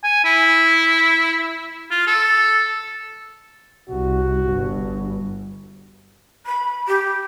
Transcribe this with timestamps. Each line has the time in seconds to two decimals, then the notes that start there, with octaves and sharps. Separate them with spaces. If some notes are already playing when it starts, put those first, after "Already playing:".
0.04 G#5
0.25 E4
1.91 F4
2.07 A4
3.89 C2 F#4
4.50 G1 G2
6.46 B5
6.88 G4